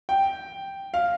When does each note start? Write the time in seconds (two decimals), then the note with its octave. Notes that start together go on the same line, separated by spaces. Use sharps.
0.09 G5
0.94 F5